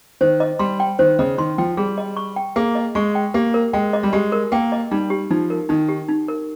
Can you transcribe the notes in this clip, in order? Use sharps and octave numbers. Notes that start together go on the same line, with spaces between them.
D#3 C5
D#5
G3 C6
G5
D#3 C5
C#3 D#5
D#3 C6
F3 G5
G3 G#4
D#5
C#6
G5
A#3 G#4
D#5
G#3 C#6
G5
A#3 G4
A#4
G#3 G5
D#5
G3
G#3 G4
A#4
A#3 G5
D#5
G3 D#4
G4
F3 D#4
A#4
D#3 D#4
G4
D#4
A#4